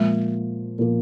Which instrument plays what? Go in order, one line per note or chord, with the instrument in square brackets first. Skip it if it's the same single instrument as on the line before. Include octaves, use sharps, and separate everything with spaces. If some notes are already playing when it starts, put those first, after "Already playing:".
Already playing: [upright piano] A#2 F3 A#3 [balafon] G#3
[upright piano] A#2 F3 A#3